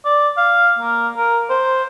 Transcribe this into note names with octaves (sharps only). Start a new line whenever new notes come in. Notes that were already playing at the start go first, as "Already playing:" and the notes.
D5
F5
A#3
A#4
C5